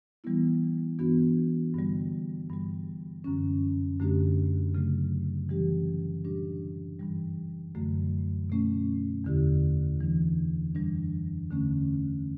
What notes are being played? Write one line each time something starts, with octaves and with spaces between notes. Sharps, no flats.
E3 G3 B3 E4
G2 E3 B3 D4 F#4
G2 D3 G3
G2 E3 G3
F#2 D3 F#3 C#4
F#2 D3 A3 D4 G4
C#3 F#3 A3
E3 G3 C#4 G4
A2 G3 D4 G4
G2 E3 G3
F#2 D3 F#3 A3
B2 A3 C#4
E2 D3 A3 E4 G4
E3 G3 D4
F#2 E3 G3 D4
E2 D3 A3 C#4